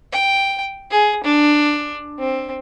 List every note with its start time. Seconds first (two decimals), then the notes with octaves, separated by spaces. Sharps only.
0.12 G5
0.91 G#4
1.24 D4
2.19 C4